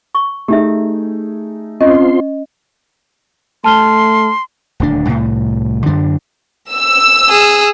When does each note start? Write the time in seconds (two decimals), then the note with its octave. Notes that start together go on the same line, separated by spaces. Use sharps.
0.15 C#6
0.48 A3 D#4 G4 G#4 E5
1.81 C4 C#4 F4 D#5 C6
3.64 A3 A5 C6 F6 G7
4.80 D#1 D2 D4
5.08 C2 A2
5.86 F#2 D3 D4
6.73 E6
7.29 G#4